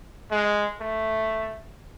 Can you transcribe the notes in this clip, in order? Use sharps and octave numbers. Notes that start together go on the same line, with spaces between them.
G#3
A3